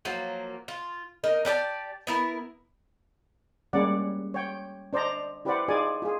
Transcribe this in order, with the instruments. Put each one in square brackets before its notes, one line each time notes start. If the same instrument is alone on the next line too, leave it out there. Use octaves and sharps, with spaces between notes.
[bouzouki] F3 F#3 A#3
F4
A#3 D#4 A#4
D4 G4 D5 A5
B3 E4 A#4
[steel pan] G3 G#3 A#3 C#4 D5 F#5
C#5 G5
D4 C5 D5 D#5 A#5
E4 G4 B4 C5 D5 F#5
D#4 F4 G#4 D5 G#5
F4 G#4